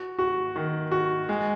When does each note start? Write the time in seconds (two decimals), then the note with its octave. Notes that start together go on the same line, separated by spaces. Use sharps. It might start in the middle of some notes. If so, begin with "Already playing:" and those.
Already playing: F#4
0.19 F#4
0.56 D#3
0.91 F#4
1.29 G#3